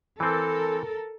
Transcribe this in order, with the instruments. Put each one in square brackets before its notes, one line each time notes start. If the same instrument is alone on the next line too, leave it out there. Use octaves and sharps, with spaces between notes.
[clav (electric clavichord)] E3 C4 [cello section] A4 A#4